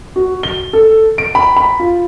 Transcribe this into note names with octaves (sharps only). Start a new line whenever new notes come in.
F#4
G7
A4
D7
B5
B5
F4